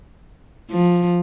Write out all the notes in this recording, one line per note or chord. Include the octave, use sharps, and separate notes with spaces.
F3